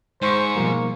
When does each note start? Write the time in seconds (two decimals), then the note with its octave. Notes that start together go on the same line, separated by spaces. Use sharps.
0.22 G#2 G#3 C5 C#6
0.56 B2 F3 G3 A#3